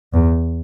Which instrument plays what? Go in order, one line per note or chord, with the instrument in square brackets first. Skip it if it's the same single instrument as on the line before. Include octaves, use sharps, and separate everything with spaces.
[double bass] E2